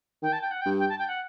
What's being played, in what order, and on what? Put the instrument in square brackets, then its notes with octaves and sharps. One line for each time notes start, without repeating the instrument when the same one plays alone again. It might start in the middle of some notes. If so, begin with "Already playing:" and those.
[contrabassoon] D#3 [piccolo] G5
[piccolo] A5
G5
F#5
G5
[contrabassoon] G2
[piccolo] G5
A5
G5
F#5